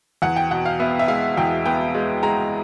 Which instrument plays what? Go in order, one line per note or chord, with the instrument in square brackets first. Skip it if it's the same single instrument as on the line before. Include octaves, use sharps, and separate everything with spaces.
[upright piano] E2 F#5
G5
B2 F#5
F5
B3 E5
E5
G#3 F5
E2 G5
B3 G5
G#3
G#3 A#5